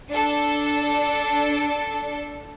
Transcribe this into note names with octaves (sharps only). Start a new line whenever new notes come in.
D4 A4